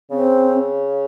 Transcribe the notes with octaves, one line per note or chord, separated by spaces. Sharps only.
C#3 C4